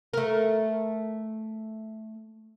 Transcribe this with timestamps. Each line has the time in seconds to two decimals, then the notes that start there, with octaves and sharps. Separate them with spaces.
0.13 A3 A#4